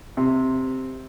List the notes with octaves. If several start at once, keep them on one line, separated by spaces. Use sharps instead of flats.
C3